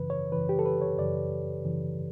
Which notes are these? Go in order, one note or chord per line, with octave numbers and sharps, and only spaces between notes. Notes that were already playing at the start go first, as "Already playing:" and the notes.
Already playing: F#2 C#3 E3 B4
C#5
F#2 C#3 E3 B4
G4
A4
B4
C#5
F#2 C#3 E3 D5
F#2 C#3 E3